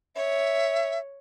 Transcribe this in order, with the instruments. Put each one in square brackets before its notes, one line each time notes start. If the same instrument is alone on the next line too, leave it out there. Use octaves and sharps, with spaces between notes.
[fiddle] C#5 [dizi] E5